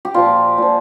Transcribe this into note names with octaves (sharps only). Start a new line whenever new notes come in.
G4
A#2 F3 F4
A#2 F3